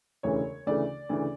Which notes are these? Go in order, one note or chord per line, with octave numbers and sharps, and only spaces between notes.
E1 D2 C#3 E3 A3 C#5
D2 C#3 E3 A3 D5
D2 C#3 E3 A3